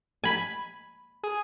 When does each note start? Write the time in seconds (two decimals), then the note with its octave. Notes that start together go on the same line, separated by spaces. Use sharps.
0.24 G#5 B5
1.24 G#4